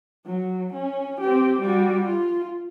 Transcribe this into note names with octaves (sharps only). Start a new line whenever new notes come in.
F#3
C#4
C4 G4
G3 F#4
F4